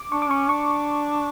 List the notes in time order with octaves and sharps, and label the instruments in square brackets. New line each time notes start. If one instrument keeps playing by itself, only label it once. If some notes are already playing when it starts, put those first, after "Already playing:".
Already playing: [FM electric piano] D6
[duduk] D4 [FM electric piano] C#6
[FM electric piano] D6
[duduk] C#4 [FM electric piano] C#6
[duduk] D4 [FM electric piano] C#6